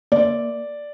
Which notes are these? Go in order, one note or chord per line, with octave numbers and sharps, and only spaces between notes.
A#3 D5